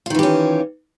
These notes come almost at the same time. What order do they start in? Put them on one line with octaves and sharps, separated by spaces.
F4 D#3 E3 G4 C#4